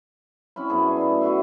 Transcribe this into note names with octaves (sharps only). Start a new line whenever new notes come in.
C4 C#4 E4 B5
F#2 B3 G#4 A5
D5 G#5
E4 G#4
A3
E4 F#4 G#4 E5